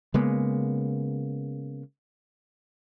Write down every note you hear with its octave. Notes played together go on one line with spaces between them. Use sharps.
C#3 G#3 A#3 B3